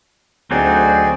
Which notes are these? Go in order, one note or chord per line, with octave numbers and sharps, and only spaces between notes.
D2 F#3 C4 D#4 F#4 G#4 D5